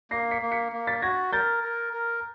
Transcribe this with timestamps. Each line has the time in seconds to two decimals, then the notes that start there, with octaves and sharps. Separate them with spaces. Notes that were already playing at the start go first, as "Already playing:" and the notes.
0.11 A#3 A#6 C7
0.31 B6 C#7
0.42 A#3
0.52 B6 C#7
0.72 A#3
0.87 A6 B6
1.02 F#4 G#6 A#6
1.32 A#4 G6 A6
1.64 A#4
1.93 A#4